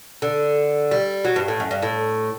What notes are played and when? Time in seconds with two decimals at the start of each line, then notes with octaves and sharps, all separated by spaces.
0.22 D3
0.91 G3
1.24 F#3
1.36 G2
1.48 A2
1.60 F#2
1.71 G2
1.82 A2